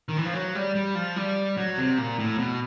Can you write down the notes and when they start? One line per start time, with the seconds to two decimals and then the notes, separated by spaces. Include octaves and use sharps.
0.09 D#3
0.17 E3
0.26 F3
0.34 F#3
0.55 G3
0.75 G3
0.95 F3
1.16 G3
1.57 F#3
1.77 C3
1.98 A#2
2.19 A2
2.38 B2